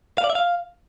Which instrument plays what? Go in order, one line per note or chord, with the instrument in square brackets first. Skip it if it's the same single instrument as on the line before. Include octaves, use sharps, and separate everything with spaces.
[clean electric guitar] F5
D5
E5
F5